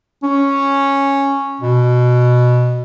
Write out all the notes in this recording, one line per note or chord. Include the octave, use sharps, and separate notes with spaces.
C#4
B2